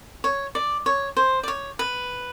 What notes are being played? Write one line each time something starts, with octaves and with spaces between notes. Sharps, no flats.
C#5
D5
C#5
C5
D5
C#5
B4